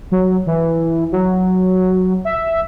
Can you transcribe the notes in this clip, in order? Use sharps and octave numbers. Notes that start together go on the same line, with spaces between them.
F#3
E3
F#3
E5